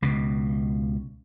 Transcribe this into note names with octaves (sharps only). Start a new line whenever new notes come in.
C#2 B2